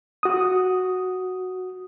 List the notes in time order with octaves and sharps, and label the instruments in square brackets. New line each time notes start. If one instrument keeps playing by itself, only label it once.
[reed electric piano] F#4 D#6